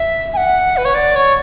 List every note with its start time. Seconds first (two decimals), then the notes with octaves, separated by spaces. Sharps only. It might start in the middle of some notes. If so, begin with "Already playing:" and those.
Already playing: E5
0.33 G#5
0.37 F#5
0.77 B4
0.85 C#5
0.95 D5
1.15 C#5